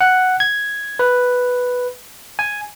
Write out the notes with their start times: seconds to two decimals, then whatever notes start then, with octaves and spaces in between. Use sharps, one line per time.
0.01 F#5
0.40 G#6
0.99 B4
2.39 G#5